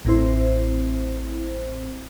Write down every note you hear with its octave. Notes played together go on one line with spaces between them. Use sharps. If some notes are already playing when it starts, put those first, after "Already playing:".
A1 A2 C4 E4 C5